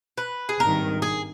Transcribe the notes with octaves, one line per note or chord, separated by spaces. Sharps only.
B4
G#4
G#1 G2 D#3 A#4
G#4